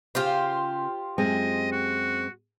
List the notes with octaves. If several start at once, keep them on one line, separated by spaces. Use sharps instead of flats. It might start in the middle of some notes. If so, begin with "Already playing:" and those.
C#3 F4 G4 C5
F#2 G#3 C4 D#5
F#4